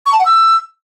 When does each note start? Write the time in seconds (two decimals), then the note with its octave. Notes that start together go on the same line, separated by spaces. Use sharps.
0.06 C#6
0.13 A5
0.19 F#5
0.25 E6